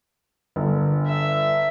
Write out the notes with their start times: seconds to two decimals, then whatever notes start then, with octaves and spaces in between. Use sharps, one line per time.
0.56 G1
1.08 E5